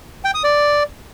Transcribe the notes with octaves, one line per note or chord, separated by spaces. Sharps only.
G5
D#6
D5